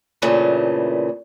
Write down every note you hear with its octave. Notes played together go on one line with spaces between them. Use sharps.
G2 A#2 C#3 E3 A3